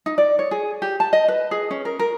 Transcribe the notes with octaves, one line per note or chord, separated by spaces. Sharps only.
D#4
D5
C#5
G#4
G4
A5
D#5
B4
G#4
C#4
A#4
A#4